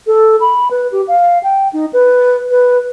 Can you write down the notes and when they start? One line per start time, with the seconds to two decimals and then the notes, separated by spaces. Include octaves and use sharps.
0.07 A4
0.40 B5
0.71 B4
0.92 G4
1.08 F5
1.43 G5
1.73 D#4
1.93 B4
2.50 B4